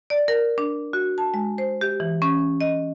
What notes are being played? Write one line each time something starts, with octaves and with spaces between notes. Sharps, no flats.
D5
A#4
D4
F#4
A5
G#3
C5
G4
E3
C#4
D#5